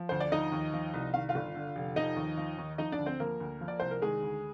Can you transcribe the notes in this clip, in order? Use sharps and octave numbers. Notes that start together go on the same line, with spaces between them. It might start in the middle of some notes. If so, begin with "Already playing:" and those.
Already playing: F3
D2 C5
D5
F3 D#4 D#5
D#2
F3
C2
D#3 F5
F4 F5
G1
D3
F1
F3 D#4 D#5
D#2
F3
D#2
F3 D#4 D#5
D4 D5
D2
C4 C5
F3 A#3 A#4
D2
F3
D5
C2 C5
A#4
D#3 G#3 G#4
D2